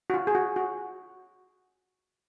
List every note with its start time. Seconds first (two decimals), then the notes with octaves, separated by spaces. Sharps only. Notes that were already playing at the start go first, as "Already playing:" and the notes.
0.10 F#4
0.14 F4
0.27 G#4
0.35 F#4
0.56 F#4